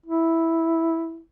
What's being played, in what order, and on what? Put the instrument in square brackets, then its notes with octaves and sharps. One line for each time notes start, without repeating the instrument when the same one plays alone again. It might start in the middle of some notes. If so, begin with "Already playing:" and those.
[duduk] E4